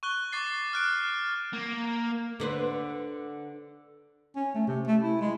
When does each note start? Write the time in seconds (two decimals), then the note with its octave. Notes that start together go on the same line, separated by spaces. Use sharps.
0.03 C#6 F#6 G7
0.33 C#6 D6 A6 C7
0.73 F6 F#6 D7
1.53 A#3
2.40 D3 B4 C5
4.36 C#4
4.54 A3
4.67 C3
4.87 A3
5.02 E4
5.21 G#3